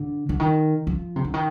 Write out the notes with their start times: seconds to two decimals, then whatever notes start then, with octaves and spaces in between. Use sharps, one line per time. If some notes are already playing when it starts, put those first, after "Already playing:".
Already playing: D3
0.29 D3
0.40 D#3
0.87 F3
1.16 C3
1.25 D3
1.34 D#3